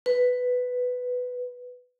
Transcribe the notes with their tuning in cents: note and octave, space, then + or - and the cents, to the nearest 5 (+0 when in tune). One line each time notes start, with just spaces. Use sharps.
B4 +10